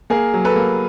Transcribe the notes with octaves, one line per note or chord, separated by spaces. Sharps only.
A#3 G#4 A#4
F#3
A4 B4
A#3